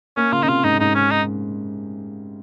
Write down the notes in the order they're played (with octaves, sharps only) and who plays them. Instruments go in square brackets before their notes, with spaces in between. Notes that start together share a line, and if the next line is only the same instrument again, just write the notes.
[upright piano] A#3 [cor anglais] C#4
[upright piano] C#3 [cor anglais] F4
[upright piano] C#3 [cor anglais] D#4
[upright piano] C3 [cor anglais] F4
[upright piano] G#2 [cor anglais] D#4
[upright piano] G#2 [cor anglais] D#4
[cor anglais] C#4
D#4